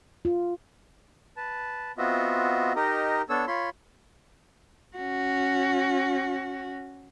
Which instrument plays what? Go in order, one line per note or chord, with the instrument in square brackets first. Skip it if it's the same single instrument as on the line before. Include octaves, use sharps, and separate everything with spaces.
[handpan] F4
[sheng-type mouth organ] B4 A5
B3 C4 F4 F#4 D#5 E5
D#4 G4 A#4 D#5
B3 D4 A4 C#5 E6
F4 C#5 B5 C6
[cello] C#4 F#4